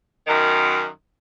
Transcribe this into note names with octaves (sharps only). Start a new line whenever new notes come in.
F#2 D#3